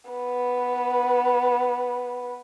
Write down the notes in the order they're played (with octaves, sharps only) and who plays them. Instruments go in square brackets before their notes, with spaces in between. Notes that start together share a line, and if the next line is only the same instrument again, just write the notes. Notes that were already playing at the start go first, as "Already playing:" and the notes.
[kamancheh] B3 B4